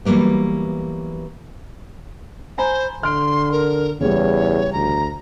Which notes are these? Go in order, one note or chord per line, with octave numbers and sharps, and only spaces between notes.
E3 F#3 G3 A#3 B3
C5 G#5 A#5 B5
D3 C6 F6 D7
A#4
E2 C#3 E3 G3 C#5
D2 A#5